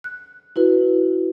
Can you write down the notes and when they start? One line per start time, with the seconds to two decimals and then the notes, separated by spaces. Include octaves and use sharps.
0.04 F#6
0.56 E4 F#4 B4